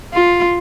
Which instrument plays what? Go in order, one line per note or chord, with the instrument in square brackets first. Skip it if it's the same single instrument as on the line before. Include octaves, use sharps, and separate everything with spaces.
[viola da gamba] F4